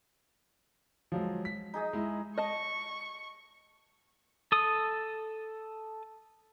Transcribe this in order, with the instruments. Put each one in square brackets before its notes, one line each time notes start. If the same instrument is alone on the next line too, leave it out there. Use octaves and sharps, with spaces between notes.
[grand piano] F3 F#3 G#3
B6
[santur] D#4 G#4 D#5
[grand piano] G#3 E4
[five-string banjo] D#5 A5 [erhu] C#6
[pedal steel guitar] A4 D#6